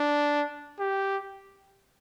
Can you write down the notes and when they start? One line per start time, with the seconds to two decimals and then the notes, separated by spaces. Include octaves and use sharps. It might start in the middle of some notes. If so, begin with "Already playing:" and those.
Already playing: D4
0.80 G4